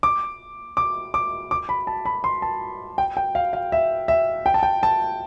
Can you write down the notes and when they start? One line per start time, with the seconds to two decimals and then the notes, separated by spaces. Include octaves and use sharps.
0.03 D6
0.77 D6
1.14 D6
1.51 D6
1.69 B5
1.87 A5
2.05 B5
2.24 C6
2.42 A5
2.98 G5
3.17 G5
3.35 F5
3.53 F5
3.72 E5
4.08 E5
4.46 G5
4.54 A5
4.63 G5
4.83 A5